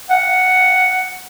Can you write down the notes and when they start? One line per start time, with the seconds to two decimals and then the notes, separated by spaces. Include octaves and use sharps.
0.10 F#5